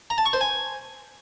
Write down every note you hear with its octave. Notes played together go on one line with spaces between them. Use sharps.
A#5
A5
C#6
C5
G#5